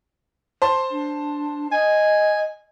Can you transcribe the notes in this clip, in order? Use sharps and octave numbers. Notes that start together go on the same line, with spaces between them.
C5 A5 C6
D4
D#5 G#5